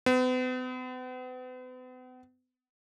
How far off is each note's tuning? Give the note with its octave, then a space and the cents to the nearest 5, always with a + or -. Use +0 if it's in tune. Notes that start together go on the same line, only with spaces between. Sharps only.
B3 +45